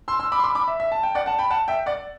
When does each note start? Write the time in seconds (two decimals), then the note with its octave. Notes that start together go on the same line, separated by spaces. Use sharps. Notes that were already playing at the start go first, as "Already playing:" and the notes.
0.08 C6 E6
0.19 C6 E6
0.32 B5 D6
0.39 C6
0.44 B5 D6
0.55 B5 D6
0.68 E5
0.80 E5
0.92 A5
1.03 G5
1.15 D5 F#5
1.26 F#5 A5
1.38 G5 B5
1.50 F#5 A5
1.68 E5 G5
1.86 D5 F#5